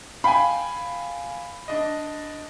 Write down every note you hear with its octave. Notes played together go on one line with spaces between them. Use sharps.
F5 G5 G#5 B5
D4 D#5